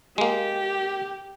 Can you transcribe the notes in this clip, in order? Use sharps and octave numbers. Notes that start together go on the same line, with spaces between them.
G#3 A#3 G4